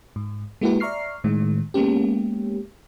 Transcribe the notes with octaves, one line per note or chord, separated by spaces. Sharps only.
G#2
G#3 A#3 E4 F#4 G4 B4
D5 E5 A#5 C#6 F6 C7
A2 D#3 G#3
G#3 A#3 B3 C#4 G4